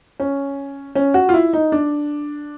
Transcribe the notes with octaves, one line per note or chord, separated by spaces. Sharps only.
C#4
C#4
F#4
F4
E4
D#4
D4